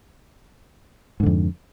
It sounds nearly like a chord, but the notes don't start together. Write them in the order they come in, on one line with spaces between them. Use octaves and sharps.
G#2 D3 F2